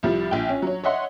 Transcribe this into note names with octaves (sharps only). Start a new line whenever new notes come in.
C2 F3 G3
A#1 G5
C#4
F#3 C#5
C#5 D#5 E5 F#5 C6